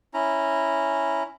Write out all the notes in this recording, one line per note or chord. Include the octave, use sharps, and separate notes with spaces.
C#4 E4 A#5